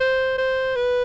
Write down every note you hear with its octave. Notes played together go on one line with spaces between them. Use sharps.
C5
C5
B4